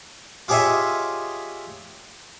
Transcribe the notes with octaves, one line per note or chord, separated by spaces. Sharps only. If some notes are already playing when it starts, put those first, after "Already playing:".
F4 G4 G#4 C#5 D#5 E5